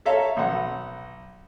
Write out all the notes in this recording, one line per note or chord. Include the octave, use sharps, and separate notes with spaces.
A4 C#5 E5 F5 A#5
B1 F#5